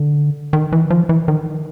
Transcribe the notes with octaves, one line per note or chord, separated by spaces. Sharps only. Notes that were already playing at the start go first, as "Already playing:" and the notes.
Already playing: D3
D#3
E3
F3
E3
D#3